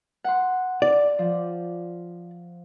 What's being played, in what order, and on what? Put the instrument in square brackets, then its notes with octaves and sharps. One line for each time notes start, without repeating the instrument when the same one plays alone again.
[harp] F#5 C6
[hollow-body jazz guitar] D5
[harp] F3